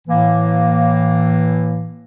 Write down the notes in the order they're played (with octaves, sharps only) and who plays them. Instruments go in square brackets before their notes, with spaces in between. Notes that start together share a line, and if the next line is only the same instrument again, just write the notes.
[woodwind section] A2 E3 A#3